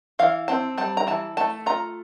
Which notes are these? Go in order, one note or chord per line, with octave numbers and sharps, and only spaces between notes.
E3 F5
C4 A5
G3 A5
A#5
E3 A5
A3 A5
F4 A#5